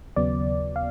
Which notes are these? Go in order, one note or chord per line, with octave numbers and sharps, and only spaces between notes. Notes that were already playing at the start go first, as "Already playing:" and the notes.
D#2 C#3 F#3 B3 D5
F5